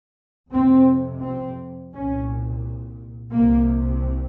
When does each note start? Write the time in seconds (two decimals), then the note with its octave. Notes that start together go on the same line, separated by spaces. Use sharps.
0.52 F2 C3 C4
1.22 C4
1.93 C2 A#2 C#4
3.32 C2 C3 A#3